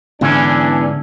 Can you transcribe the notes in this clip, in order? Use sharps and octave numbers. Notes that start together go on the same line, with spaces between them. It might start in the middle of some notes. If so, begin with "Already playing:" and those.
E2 G#2 D3 E3 C#4 D4